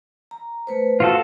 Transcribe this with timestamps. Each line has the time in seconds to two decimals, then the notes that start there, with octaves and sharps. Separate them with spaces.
0.31 A#5
0.67 A3 B4 C5
1.00 F4 F#4 A4